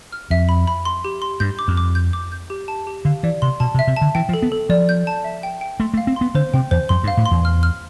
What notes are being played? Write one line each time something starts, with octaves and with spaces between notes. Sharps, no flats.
F6
F2 E5
B5
B5
C6
G4
C6
G2 G6
D6
F2
D6
G6
D6
G6
G4
A5
G4
D3 F5
E3 D5
C3 C6
B2 A5
C3
E5
C3
D3 A5
E3 G5
F3
A4
B3
A4
F3 D5
G6
A5
E5
G5
G5
A3 C6
A3
F5
C4
B3 C6
D3 C5
C3 G5
E2 C5
F2 C6
G2
F5
A2
C6
E2
F6
F6